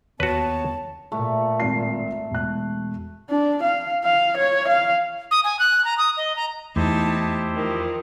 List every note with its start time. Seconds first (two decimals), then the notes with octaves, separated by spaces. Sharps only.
0.20 D#2 B3 F#4 B4 C#5 A5
1.12 A#2 A3
1.60 G#1 E5 C7
2.30 E1 F#6
3.29 D4
3.63 F5
4.04 F5
4.37 C#5
4.68 F5
5.31 D#6
5.44 G#5
5.59 F#6
5.85 A#5
5.98 D#6
6.17 D#5
6.36 A#5
6.76 E2 A3 D#4 E4 G4 C5 A5
7.55 D#3 F3